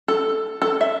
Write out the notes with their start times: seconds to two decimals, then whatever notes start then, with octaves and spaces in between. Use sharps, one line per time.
0.08 A4
0.62 A4
0.81 E5